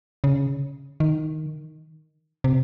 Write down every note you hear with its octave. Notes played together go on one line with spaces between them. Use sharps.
C#3
D#3
C3